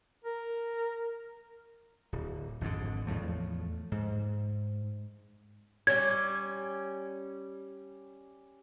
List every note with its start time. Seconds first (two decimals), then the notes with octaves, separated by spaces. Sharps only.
0.24 A#4
2.12 D1
2.61 G#1 F2 G#2 D3
3.07 E2 A2 F3 A3
3.92 G#2
5.87 G3 C#4 G#6